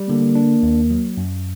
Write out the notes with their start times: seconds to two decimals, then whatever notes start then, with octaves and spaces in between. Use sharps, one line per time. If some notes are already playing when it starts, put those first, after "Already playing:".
Already playing: G3
0.09 D3 A#3
0.35 D4
0.63 D#2
0.90 F#3
1.17 F#2